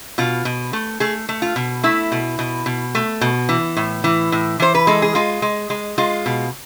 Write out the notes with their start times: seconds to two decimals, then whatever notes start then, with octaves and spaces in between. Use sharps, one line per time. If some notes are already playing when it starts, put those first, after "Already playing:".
0.18 B2 F4
0.45 B2
0.73 A3
1.00 A3 G#4
1.29 A3
1.42 F4
1.56 B2
1.83 A3 E4
2.12 B2
2.39 B2
2.66 B2
2.95 A3
3.21 B2
3.49 E3
3.77 A2
4.04 E3
4.32 A2
4.60 E3 C5
4.75 B4
4.87 G#3 A4
5.02 G#4
5.15 G#3 F4
5.42 G#3
5.70 G#3
5.98 G#3 F4
6.26 B2